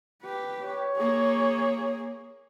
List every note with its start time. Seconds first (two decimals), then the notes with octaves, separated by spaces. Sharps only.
0.24 G4 B4
0.63 C#5
0.97 A#3 G#4